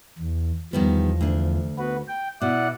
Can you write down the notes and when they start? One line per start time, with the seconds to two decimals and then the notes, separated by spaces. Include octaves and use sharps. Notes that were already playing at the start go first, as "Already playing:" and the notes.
0.19 E2
0.73 E2 D#3 F3 G3 B3
1.21 D2 D4
1.78 B3 F#4 B4
2.08 G5
2.41 B2 E4 D5 F#5